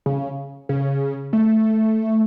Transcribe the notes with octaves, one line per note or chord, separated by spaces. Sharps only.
C#3
C#3
A3